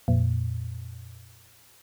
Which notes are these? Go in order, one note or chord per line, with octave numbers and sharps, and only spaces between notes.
F2 A#2